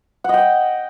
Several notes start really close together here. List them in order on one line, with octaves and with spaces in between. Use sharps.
F#5 D#5 G5